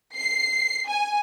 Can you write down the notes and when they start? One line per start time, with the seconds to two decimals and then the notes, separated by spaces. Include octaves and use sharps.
0.17 C7
0.88 G#5